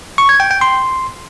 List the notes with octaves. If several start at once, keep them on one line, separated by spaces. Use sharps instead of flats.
C#6
G#6
G5
G5
C6